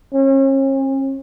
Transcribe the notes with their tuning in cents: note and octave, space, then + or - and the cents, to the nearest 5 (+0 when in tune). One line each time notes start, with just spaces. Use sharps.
C#4 -40